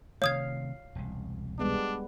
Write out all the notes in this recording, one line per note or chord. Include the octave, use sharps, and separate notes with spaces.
C3 D#3 A3 C#5 F5 D#6 G#6
E1 C2
G3 G#3 B3 D4